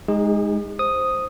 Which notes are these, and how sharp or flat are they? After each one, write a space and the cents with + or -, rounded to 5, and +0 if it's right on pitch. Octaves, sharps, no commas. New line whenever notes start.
G#3 +0 D#4 +0 G#4 -45
C5 +0 D#6 +0